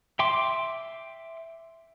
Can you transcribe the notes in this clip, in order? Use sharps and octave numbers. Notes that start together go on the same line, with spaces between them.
E5 G5 C6 D6